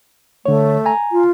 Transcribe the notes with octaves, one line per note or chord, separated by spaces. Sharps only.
D3 A3 C#5
G#5 A#5
F4